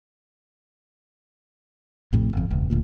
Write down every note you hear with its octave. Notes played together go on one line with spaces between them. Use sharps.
A1 F2 A2 C3
G1 F2
E1 C#2
D1 D2 A#2